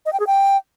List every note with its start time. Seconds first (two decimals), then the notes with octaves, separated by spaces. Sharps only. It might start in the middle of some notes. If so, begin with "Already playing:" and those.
0.06 D#5
0.13 G5
0.20 G#4
0.27 G5